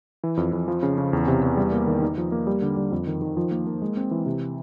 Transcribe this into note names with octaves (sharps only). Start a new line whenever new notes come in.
E3
F2
F2
F3
C#3
C#3
E2
C3
E2
G3
A#3
D#3
D#4
F3
A#3
G3
D3
G3
F2
D#3
D#3
F3
A#3
A#3
G#3
C4
E3
C3